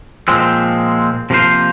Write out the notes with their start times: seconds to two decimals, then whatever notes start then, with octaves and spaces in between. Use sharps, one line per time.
0.28 A#2 F3 G#3 C4
1.30 C3 F3 A#3 F4 C5